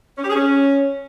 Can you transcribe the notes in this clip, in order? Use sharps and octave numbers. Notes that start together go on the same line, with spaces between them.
C#4
G4
G#4
C#4